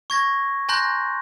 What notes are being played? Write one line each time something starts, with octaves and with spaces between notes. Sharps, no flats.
C#6 G#6 A#6
G#5 A#5 C6 F#6 G6 A#6